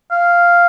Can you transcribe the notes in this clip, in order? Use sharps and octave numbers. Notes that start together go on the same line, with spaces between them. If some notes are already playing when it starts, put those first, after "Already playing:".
F5